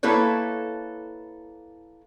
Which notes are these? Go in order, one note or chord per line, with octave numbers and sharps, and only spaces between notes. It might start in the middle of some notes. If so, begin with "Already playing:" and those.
A#3 E4 A4 B4 C#5